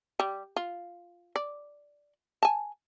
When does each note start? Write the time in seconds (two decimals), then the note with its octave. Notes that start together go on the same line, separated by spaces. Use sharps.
0.20 G3
0.56 F4
1.36 D5
2.43 G#5 A5